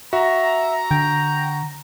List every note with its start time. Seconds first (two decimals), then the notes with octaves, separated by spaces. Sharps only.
0.13 F#4 E5 A#5
0.91 D3 G5